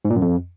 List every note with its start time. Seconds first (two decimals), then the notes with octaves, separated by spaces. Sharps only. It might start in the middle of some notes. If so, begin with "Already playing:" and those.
0.05 G#2
0.10 A#2
0.16 F#2
0.22 F2